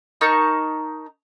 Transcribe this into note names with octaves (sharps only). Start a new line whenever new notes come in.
D#4 A#4 A5 C#6